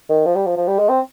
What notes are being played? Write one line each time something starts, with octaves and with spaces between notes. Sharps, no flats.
D#3
F3
G3
F3
F3
G3
G#3
C4